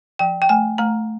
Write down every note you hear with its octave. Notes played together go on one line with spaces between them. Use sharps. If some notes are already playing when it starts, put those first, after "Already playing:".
F3 G5
G5
A3 G#5
A3 A#5